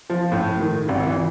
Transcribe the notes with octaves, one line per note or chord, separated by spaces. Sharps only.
F3
A2
D#3
G#1
E3